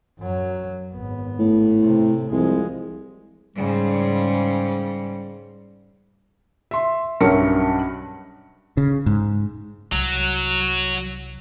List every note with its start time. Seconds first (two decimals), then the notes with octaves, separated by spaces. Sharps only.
0.19 F#2 F#3
0.94 G#1 B3
1.39 A2
1.84 C3
2.31 C2 F3 G#3
3.56 G#2 C#3 G3
6.71 E5 C6
7.21 B1 G2 C#4 A#4 E5 C#7
8.77 C#3
9.06 G#2
9.92 C2 F#3